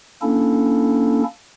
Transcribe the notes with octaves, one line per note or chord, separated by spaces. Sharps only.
A#3 C#4 D4 E4 A4